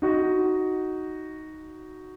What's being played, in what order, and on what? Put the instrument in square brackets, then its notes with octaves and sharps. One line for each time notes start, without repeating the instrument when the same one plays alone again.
[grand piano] D#4 F#4